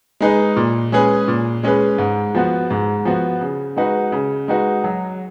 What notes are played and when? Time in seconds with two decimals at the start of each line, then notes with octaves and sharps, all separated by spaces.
0.21 G#3 D#4 G#4 B4
0.56 A#2
0.92 G#3 C#4 G#4 B4
1.28 A#2
1.63 G#3 C#4 G#4 B4
1.98 G#2
2.35 F3 B3 F#4
2.71 G#2
3.05 F3 B3 F#4
3.41 C#3
3.76 G#3 D#4 F#4 B4
4.12 C#3
4.48 G#3 D#4 F#4 B4
4.84 F#3